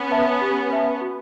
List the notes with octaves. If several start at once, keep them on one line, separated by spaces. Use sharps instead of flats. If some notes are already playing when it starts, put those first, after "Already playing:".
Already playing: B3 C#4
B4 E5 A5
G4
B4 E5 A5
F#4